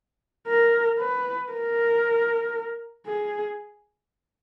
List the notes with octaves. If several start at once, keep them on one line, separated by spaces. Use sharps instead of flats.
A#4
B4
A#4
G#4